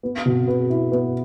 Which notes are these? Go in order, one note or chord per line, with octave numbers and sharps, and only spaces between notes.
B3
B2
B4
E4
B3